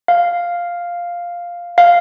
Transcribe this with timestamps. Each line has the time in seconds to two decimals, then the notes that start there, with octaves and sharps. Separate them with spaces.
0.08 F5
1.78 F5